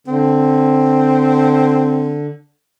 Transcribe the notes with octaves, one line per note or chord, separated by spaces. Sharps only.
D3 C4